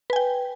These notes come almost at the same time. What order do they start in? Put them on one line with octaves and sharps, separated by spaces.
B4 G#5 G5